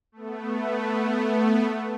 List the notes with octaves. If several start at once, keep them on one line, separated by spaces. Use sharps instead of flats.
A3 B3